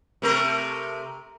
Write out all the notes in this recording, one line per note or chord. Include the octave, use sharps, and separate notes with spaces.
C3 A3 A#4